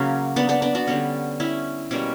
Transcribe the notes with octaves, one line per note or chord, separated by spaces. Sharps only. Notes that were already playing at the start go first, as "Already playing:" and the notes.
Already playing: C#3 F#3 A#3 C#4
B3 D4
B3 D4
B3 D4
D4 F#4
D3 G3 B3 C#4
C#4 E4
B2 G3 A#3 C#4